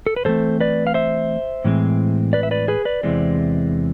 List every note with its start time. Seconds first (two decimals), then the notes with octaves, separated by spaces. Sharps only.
0.06 A4
0.16 B4
0.25 A2 E3 A3 C4 A4 C5
0.60 B4 D5
0.87 F5
0.94 C5 E5
1.64 A2 E3 G#3 C4
2.33 B4 D5
2.43 E5
2.51 B4 D5
2.68 G#4 B4
2.85 B4 D5
3.03 E2 C3 E3 G#3 C4